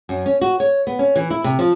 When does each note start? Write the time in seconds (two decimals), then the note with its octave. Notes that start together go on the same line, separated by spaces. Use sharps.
0.09 F#2
0.26 C#4
0.41 F#4
0.60 C#5
0.87 B3
0.99 C#4
1.16 E3
1.30 E4
1.44 C3
1.59 F3